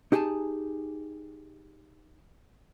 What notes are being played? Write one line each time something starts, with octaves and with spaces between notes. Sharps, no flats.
D#4 G4 G#4 G#5 A5